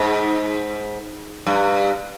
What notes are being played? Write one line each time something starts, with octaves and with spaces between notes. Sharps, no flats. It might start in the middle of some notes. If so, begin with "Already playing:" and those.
Already playing: G#2
G2